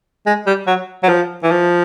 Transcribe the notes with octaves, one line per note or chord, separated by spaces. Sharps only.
G#3
G3
F#3
F#3
F3
E3
F3